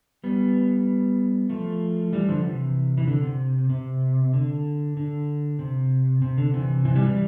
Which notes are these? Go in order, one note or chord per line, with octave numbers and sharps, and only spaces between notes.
G3 B3
F3 A3
E3 G3
D3 F3
C3 E3
E3
D3
C3
C3
D3
D3
C3
C3
D3
C3 E3
C3 E3
E3 G3
E3 G3